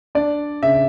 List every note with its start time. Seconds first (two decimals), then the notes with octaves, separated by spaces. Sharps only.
0.15 D4 D5
0.63 C#3 E5